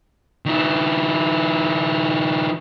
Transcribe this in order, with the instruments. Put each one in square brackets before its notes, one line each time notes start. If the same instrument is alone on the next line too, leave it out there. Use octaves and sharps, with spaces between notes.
[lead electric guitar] D#3 E4